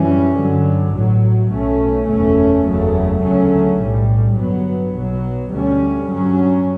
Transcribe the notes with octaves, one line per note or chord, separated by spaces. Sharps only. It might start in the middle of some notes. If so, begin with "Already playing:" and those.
Already playing: F#2 E3 G3 C#4
G2 D3 F#3
A1 A2 F#3
B1 B2 A3 C#4
F#1 E2 B2 A3 C#4
F#1 E2 C#3 F#3 A3
D2 C#3 F#3 A3 C#4
B1 A2 G3
G1 G2 F#3 B3
B1 B2 F#3
D2 D3 G3 C#4
G2 F#3 C#4